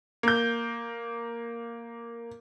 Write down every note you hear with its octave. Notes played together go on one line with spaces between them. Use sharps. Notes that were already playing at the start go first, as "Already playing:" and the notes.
A#3 G6